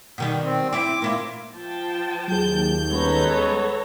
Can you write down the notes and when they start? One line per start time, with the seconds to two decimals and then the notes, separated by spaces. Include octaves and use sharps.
0.18 B2 D#3 G3
0.44 C4
0.73 C4 E4 D6
1.02 A#3 E4 F4
1.55 F3 G5 A5
2.28 D#2 F#3 G#4 G6
2.91 G3 G#3 B3 C#4 A4 B4 C#5 A#5